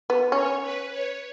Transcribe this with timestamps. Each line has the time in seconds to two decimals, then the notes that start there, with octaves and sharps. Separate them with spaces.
0.10 B3
0.32 C#4 C#5
0.62 B4
0.92 C#5